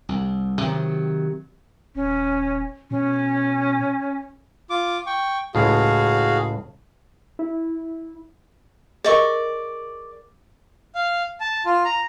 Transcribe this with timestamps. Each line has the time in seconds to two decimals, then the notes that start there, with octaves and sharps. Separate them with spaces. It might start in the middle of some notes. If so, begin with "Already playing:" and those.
0.09 C2
0.61 C3 D#3 F#3
1.95 D#1 C#4
2.91 B2 C#4
4.70 F4 D6
5.06 G5 C#6
5.55 C#2 A2 F#4 G#4 F5
7.39 E4
9.04 G#4 A#4 D5 D#5 C#6
10.95 F5
11.40 A5
11.66 F4
11.85 A#5